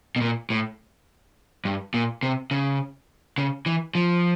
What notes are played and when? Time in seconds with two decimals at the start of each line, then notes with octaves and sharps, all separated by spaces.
0.16 B2
0.21 A#2
0.50 A2
1.65 G2
1.94 A#2
2.23 C3
2.51 C#3
3.38 C#3
3.66 E3
3.95 F3